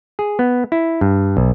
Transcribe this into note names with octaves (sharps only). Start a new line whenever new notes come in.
G#4
B3
E4
G2
B1